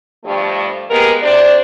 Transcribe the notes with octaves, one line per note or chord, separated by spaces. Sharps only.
G2 F3 G3 A3
G#3 A#3 B3 G4 A#4
C3 D4 C5 D5